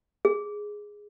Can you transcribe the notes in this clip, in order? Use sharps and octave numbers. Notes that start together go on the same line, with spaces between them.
G#4